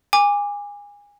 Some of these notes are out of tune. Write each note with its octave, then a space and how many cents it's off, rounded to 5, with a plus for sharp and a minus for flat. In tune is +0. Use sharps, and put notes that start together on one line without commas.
G#5 -25 D6 +0